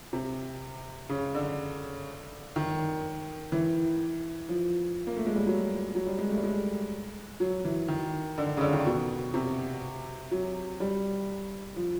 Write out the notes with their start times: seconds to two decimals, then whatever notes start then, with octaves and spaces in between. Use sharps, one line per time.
0.13 C3
1.09 C#3
1.35 D3
2.56 D#3
3.52 E3
4.49 F3
5.07 A#3
5.16 A3
5.27 G#3
5.36 G3
5.47 F#3
5.95 F#3
6.07 G3
6.19 G#3
6.31 A3
6.37 G3
6.44 G#3
7.40 F#3
7.65 E3
7.88 D#3
8.38 D3
8.57 C#3
8.61 D3
8.73 D#3
8.86 B2
9.34 C3
10.31 F#3
10.80 G3
11.76 F3